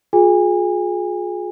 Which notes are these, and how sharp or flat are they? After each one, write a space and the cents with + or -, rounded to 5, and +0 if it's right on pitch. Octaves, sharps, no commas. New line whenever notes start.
F4 +40 G#4 +20 G#5 -35